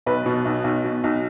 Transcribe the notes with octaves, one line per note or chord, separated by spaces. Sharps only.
B1 B4
B2
B1
B1
B2
B1